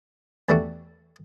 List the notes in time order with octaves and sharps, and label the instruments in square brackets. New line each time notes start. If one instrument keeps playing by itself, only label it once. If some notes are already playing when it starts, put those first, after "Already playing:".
[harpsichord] E2 G3 A3 D4 F#4